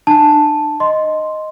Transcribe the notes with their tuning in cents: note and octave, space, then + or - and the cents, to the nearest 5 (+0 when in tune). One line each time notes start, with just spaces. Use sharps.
D4 +40 A5 +0
D#5 +0 C6 +0